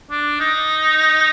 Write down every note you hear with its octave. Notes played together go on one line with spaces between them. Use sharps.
D4
D#4